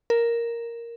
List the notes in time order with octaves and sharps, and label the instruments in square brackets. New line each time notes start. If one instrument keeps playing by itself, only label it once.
[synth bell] A#4